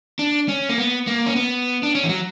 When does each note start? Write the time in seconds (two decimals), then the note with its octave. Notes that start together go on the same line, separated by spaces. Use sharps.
0.19 D4
0.48 C#4
0.69 A#3
0.78 B3
1.07 A#3
1.26 C#4
1.36 B3
1.83 D4
1.95 C#4
2.04 E3
2.09 F#3